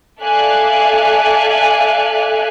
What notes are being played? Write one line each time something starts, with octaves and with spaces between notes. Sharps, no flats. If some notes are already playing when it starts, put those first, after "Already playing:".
A4 D5 E5 F5 G#5 F#6